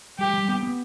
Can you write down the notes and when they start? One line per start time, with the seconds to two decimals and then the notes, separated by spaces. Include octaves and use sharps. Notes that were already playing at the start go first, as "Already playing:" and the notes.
0.19 G3 G4
0.33 G3
0.49 B3
0.63 B3